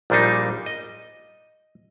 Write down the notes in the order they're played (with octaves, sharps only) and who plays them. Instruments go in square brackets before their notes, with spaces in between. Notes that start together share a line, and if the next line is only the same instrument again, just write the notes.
[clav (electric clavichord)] A#1 A#2 G3 D4 D#4
D#5